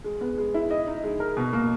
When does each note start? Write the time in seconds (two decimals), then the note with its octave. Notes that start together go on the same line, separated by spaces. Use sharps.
0.04 G#3
0.21 B3
0.38 G#3
0.54 E4
0.71 D#5
0.87 D#4
1.04 G#3
1.20 A#4
1.37 B2
1.53 A#3